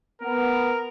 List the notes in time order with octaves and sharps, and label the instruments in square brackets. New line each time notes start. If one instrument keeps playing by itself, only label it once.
[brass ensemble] B3 [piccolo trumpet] A#4